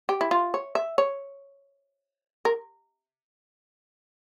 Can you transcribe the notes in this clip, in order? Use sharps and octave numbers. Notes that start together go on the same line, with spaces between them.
G4
E4
F4
C#5
E5
C#5
A#4